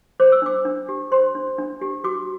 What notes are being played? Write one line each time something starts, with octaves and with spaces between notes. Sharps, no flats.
C5 D6
E6
D4 D6
D4
G4
C5 C6
D4
D4
G4
F#4 D6